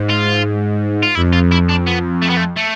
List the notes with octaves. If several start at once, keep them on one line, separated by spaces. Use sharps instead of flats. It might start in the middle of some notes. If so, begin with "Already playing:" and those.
Already playing: G#2
F4
F4
F2 E4
F4
E4
D4
B3
A3
B3
A3
A3